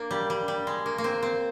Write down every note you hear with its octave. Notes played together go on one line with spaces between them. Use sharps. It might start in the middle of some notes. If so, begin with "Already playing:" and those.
Already playing: A#3 D4
G3
G3
G3
G#3
A#3
A#3
C4
C4